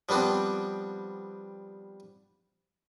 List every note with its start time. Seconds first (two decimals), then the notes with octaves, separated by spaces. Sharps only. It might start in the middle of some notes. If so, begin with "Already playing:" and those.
0.09 F3 G3 B3 C4 D4